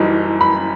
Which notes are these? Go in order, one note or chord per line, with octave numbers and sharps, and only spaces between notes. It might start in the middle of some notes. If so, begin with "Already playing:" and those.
Already playing: F#1 F#2 E3 G3 D#4
B5